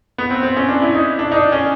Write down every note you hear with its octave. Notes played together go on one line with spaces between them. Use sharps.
B3
C4
C4
C#4
D4
E4
D#4
D4
D#4
D4
C#4